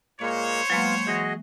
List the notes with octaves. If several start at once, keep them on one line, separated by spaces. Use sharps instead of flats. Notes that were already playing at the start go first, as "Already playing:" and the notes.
A#2 G#3 A#3 C5 C#5
F#3 G#3 A#3 B3 F4
E3 F#4 G#4 D#5